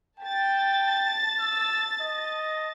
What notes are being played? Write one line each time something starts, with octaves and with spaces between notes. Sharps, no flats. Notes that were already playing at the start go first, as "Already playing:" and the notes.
G5 A5 A6
E6
D#5